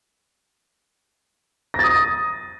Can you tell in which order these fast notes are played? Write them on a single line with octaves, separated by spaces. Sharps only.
A#6 A6 D#6